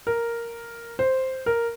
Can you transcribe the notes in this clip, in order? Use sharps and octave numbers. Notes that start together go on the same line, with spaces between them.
A#4
C5
A#4